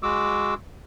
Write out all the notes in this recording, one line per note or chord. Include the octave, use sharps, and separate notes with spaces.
G#3 F#4 D6 E6